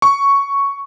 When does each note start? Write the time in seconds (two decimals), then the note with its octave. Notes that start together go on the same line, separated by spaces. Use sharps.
0.02 C#6